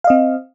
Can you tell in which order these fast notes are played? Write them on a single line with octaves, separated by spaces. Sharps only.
F5 D#5 C4